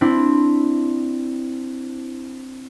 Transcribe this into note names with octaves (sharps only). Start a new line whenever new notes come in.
C4 D4 E4